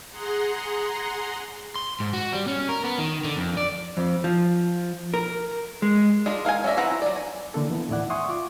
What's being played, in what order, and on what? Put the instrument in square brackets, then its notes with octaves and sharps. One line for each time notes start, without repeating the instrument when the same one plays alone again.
[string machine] G#4 F#5 A#5 C6
[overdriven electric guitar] C6
G#2
F#4
G3
C#4
A#4
B3
D#3
D3
F2
D5
[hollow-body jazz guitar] F2
F3
A#4
G#3
[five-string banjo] G#3 D4 F4
A#4 F5 F#5 G#5
C#4 D4 D5 E5 A#5
E3 C4 F#5 A#5
F#3 D5
G#5
[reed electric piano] D3 E3 A#3 D4 A4
E3 F3 B3
D#2 A2 D#3 E4 D5 F#5
E5 F#5 G#5 C6 C#6 D#6
F4 D6